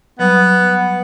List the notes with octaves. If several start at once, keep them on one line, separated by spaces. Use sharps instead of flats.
F#3 G3 B3